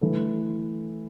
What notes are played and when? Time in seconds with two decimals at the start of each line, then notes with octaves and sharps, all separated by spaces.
0.01 E3 A3 E4 A4